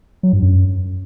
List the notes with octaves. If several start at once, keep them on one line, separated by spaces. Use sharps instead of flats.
F#3
G2
F#2